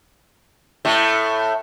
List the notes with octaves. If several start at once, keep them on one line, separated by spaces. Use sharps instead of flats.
A2 A3